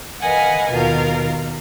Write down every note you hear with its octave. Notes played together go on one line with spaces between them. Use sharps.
A#4 B4 D#5 F5 F#5 G#5
D#2 B2 F4 A#4 F5